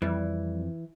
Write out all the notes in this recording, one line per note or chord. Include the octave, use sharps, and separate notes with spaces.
F2 E3 G3